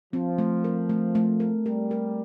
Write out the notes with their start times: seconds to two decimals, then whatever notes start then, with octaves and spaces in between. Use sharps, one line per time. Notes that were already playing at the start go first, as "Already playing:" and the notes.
0.13 F3 C4
0.38 A3
0.64 A#4
0.89 A3
1.15 A3
1.40 A#4
1.65 G3 A#4
1.91 A#4